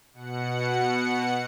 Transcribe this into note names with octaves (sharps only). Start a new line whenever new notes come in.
B2 F#5 C#7